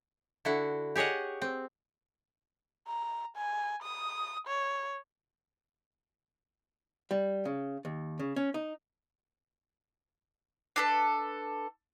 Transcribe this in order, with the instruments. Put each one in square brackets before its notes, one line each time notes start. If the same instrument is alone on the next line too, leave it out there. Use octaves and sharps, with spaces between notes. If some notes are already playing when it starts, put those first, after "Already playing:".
[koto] D3 E4 F#4
G4 G#4 C#5 D#5 F#5
C4
[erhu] A#5
G#5
D#6
C#5
[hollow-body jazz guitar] G3
C#3
D#2
C#3
C#4
D#4
[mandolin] D4 A4 B4